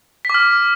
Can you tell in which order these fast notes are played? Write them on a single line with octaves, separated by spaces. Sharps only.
B6 D6 F6